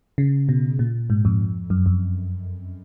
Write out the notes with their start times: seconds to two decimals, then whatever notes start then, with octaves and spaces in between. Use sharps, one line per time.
0.18 C#3
0.49 B2
0.79 A#2
1.10 G#2
1.25 F2
1.70 F#2
1.86 F2